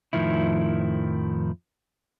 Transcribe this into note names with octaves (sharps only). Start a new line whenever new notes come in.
F2 A2 D#3 F3 E4